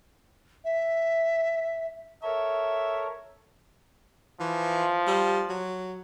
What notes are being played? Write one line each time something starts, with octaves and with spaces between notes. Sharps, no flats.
E5
A4 A#4 C#5 E5
E3 F3
G3
F#3